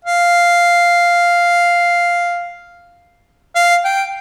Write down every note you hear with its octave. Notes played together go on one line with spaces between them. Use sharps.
F5
F5
G5